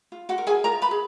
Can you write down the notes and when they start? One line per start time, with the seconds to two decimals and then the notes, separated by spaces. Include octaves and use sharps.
0.12 F4
0.29 F#4 F#5
0.38 A#4
0.47 G#4 G#5
0.64 F4 A#4 A#5
0.82 B4 B5
0.91 G#4